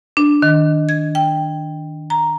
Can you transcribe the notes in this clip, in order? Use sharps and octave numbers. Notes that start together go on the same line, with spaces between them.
D4
D#3
G#6
G5
A#5